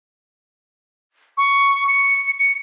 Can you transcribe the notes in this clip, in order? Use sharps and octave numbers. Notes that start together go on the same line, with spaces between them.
C#6
C#7
C#7